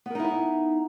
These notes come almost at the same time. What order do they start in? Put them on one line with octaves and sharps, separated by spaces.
B3 A#4 D#4 E4 E5